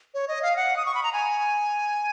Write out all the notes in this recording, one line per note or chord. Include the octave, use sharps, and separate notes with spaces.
C#5
D#5
F5
F#5
D#6
C#6
B5
A#5
G#5